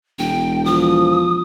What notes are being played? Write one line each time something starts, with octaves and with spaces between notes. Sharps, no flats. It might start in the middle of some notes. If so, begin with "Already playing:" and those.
E1 G5
F3 D#6